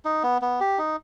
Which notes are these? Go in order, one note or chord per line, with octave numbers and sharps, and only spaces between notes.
D#4
B3
B3
G4
D#4